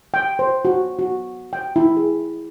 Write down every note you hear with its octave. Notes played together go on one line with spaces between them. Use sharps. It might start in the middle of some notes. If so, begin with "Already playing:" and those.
G5
C5
F#4
F#4
G5
E4
G#4